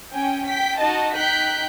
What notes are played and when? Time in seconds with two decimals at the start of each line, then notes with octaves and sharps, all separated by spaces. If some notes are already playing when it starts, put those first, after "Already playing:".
0.13 C#4 G5 G#5
0.48 G5 B6
0.80 D#4 F#4 D#5 A5
1.16 D#4 G5 F#6 G6 B6